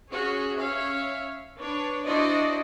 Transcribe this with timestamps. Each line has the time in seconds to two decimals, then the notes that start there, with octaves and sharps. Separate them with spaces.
0.10 C#4 F#4 G#4 C#5
0.57 C#4 C#5 E5 F5
1.58 D4 B4 C#5
2.06 D4 E4 F#4 C5 D5 D#5